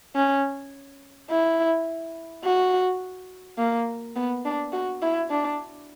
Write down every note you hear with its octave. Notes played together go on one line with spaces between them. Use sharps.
C#4
E4
F#4
A#3
B3
D4
F#4
E4
D4